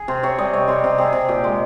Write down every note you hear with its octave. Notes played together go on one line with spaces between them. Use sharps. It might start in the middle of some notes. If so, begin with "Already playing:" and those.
Already playing: G#4
C3 C5
C3 C#5
G3 D#5
C3 C#5
C3 C5
C3
C3 G#4
C3
A#2 G4
G#3